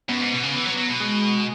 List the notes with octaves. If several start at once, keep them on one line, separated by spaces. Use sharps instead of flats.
F#2 B3
G#2
B2
C#3
E3
F#3
F#3
B2
G#3